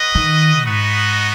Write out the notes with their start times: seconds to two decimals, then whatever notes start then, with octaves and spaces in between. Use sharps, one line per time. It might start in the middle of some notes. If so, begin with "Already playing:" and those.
Already playing: F#4 B4 D#5
0.15 D#3
0.64 G#2 B3 D#4 F#4 B4 D#5